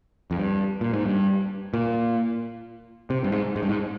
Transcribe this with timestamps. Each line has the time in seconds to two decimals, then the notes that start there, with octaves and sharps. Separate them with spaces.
0.31 F2
0.37 G2
0.81 A#2
0.93 G#2
1.06 G2
1.74 A#2
3.10 C3
3.24 G2
3.32 G#2
3.56 G#2
3.63 G2
3.69 G#2